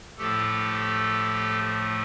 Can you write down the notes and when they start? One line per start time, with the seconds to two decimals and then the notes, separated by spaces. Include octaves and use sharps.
0.17 A2 F3 A3 G4 A4